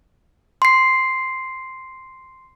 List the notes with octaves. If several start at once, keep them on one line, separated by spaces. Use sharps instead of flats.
C6 C7